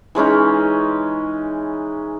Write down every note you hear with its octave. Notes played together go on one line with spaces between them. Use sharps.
E3 G#3 C#4 D#4